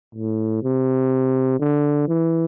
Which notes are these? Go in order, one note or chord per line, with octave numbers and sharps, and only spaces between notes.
A2
C3
D3
E3